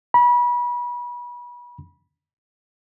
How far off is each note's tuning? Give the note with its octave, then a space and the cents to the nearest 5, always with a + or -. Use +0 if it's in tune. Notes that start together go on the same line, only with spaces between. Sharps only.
B5 -30